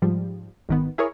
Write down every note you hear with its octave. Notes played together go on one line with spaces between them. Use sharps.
G#2 F3 G3
G#1 D#3 B3
E4 G#4 A#4 C#5